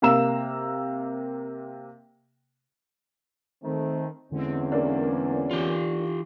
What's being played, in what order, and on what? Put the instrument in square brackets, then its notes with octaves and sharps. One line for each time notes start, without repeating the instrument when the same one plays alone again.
[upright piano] C3 A#3 F5 A#5 E6 E7
[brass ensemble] D#3 A3 C4
[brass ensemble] E2 C#4 [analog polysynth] D3 G#3 C4
[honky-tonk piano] A#3 D4
[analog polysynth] E3 [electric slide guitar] F4 G4